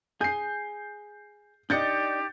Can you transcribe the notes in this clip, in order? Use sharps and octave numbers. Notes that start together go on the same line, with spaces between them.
G#4 G6 C7
D4 D#4 G4 D5 D#5 G6 A6 C#7